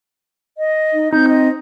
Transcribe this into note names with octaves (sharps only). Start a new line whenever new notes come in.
D#5
D#4
C4 D#4 G6
D#5